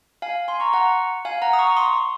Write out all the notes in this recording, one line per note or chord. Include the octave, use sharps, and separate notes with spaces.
F5 G#5
G#5 C6
A#5 C#6
F#5 A#5
F5 G#5
F#5 A#5
D#6
A#5 C#6
C6 D#6